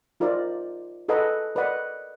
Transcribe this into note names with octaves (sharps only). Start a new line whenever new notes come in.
D#4 F4 A#4 C5 D5
G#4 A4 B4 D#5 F#5 A#5
A#4 B4 D5 D#5 F#5